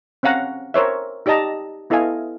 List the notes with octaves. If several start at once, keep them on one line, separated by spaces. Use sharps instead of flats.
C4 C#4 F5 F#5 A#5
A#4 C5 C#5 E5
D#4 G4 D5 D#5 A5 A#5
B3 E4 A4 D#5 F5 G#5